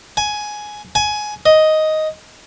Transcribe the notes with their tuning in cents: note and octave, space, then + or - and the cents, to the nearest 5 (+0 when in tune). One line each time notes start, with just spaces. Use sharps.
G#5 +10
G#5 +15
D#5 +5